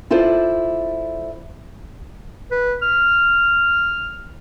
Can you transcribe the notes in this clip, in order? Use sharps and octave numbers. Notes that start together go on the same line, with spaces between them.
E4 F4 A4 C5 D5
B4
F6